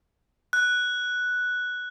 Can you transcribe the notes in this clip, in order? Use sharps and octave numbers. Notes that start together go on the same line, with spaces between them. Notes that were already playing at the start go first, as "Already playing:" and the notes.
F#6